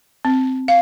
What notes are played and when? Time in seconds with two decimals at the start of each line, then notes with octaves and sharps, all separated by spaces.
0.25 C4
0.68 F5